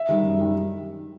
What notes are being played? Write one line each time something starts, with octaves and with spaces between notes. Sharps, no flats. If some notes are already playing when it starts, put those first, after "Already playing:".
Already playing: E5
D#3 G3
F#2
D#3 G3